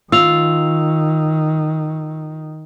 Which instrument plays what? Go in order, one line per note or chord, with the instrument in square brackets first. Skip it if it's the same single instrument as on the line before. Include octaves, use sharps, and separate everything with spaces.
[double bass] D#3 [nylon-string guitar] F4 [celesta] E6 F7